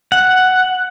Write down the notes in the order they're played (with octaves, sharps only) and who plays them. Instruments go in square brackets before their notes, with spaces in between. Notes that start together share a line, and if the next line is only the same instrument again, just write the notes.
[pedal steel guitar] F#5